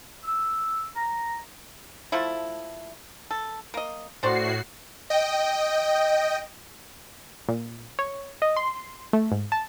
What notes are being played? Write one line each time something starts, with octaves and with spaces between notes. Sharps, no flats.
E6
A#5
F3 A3 E4
A4
A#3 D#5
A2 D4 F#4 C5 D5 C7
D#5 G5
A#2
C#5
D#5
C6
A3
G#2
A5